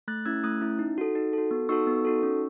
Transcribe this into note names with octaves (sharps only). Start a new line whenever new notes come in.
A3 F#6 A6
C#4 E4 E6 G#6
A3 D#6 F#6
C#4 E4
D#4
F#4 A4
D#4
F#4 A4
B3
D#4 F#4 A4 C#6 E6
B3
D#4 F#4 A4
C#4